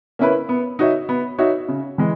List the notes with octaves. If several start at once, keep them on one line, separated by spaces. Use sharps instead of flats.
A#3 C#4 E4 B4
B3
D#4 F#4 C#5 E5
B3
D#4 F#4 C#5 E5
C#3
E3 G#3